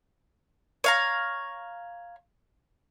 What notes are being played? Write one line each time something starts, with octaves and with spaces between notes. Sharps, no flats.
C#5 F5 A#5